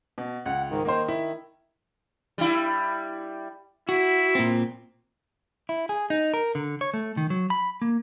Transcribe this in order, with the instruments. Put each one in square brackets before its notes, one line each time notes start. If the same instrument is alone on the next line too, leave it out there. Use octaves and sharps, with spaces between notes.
[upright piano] B2
[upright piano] C#2 [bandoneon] F#5
[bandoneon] G#2 D#3
[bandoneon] D#3 [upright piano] A#3 D#4 C5
[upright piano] E4
[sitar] G3 E4
[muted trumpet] E4 [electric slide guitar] F#4
[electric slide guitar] A#2 C4
[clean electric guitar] E4
G#4
D#4
A#4
D3
C#5
A3
D#3
F#3
B5
A#3